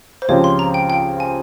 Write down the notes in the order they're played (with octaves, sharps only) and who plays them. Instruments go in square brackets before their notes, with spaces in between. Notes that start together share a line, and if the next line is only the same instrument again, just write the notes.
[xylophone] C5
[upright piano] C#2 C#3 F3 C4 G4 [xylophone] C#5
[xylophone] C6
A#5
G5
G5
G#5